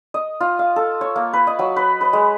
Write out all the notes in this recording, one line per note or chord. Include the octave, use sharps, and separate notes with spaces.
D#5
F4
F5
A4
C#5
A#3
B4
D#5
F#3
B4
B4
G#3